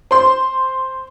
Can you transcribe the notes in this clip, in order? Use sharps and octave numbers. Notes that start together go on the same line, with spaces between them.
C5 C6